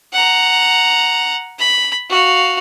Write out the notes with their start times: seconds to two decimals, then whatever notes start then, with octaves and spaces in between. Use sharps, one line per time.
0.13 F#5 A#5
1.59 B5
2.10 F#4 F5